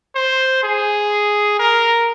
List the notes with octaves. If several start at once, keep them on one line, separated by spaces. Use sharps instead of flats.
C5
G#4
A#4